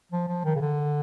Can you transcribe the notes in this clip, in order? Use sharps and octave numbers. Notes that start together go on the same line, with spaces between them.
F3
F3
D#3
C#3
D3